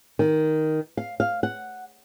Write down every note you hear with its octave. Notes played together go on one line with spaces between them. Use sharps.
D#3
F5
F5
F#5